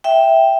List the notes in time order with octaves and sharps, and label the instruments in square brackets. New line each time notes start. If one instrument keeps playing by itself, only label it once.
[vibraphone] E5 G5